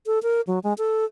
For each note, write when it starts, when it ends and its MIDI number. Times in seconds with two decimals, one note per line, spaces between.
0.06 0.19 69
0.23 0.41 70
0.47 0.59 54
0.64 0.73 56
0.78 1.05 69